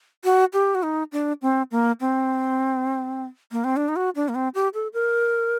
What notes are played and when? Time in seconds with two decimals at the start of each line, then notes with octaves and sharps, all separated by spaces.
0.24 F#4
0.53 G4
0.75 F#4
0.83 D#4
1.12 D4
1.42 C4
1.71 A#3
2.00 C4
3.52 A#3
3.64 C4
3.76 D4
3.88 D#4
3.96 F#4
4.16 D4
4.29 A#3
4.35 C4
4.55 G4
4.74 A4
4.93 A#4